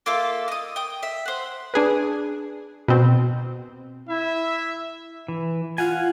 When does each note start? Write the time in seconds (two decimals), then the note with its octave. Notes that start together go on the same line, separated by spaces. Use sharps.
0.06 A#3 F4 A4 E5
0.48 D#5 D#6
0.76 G5 D#6
1.03 E5
1.26 C5 F#5
1.74 D4 G#4 B4
2.88 B2 C4
4.09 E4 E5
5.28 E3
5.78 F4 F5 F#5 G#5